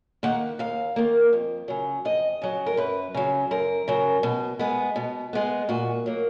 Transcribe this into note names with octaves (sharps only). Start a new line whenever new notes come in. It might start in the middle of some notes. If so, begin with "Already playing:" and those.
D#3 A#3 F#5
D#2 F5
D#3 A#3
F2
C#3 F#3
F2 D#5
C#3 F#3
A#4
F#2 B4
C#3 F#3
F#2 A#4
C#3 F#3
B2
G#3 B3
B2
G#3 B3
A#2 F#4
F#3 A#3